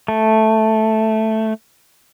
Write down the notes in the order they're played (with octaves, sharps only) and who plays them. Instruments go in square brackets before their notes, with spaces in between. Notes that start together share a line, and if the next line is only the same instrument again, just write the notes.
[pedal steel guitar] A3